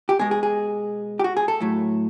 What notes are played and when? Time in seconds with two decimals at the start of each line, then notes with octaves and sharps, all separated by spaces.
0.09 G4
0.19 B2 G#3 G#4
0.31 G#4
0.43 G#4
1.19 G4
1.24 F#4
1.37 G#4
1.48 A4
1.60 A2 F#3 A3